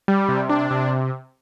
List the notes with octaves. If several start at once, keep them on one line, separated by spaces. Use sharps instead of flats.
G3
C3
D4
C3